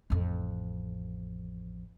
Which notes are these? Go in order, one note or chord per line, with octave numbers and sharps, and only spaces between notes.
A1 F2